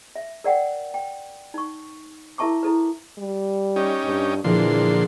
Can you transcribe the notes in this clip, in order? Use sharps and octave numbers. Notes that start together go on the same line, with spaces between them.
E5
A#4 D5 F#5 G5
G5
D#4 C#6
E4 A#4 E5 A5 C#6 D6
E4 A4 B4
G3
C#4 D#4 G4
G2
A#2 D3 E3 F3 G#4 C6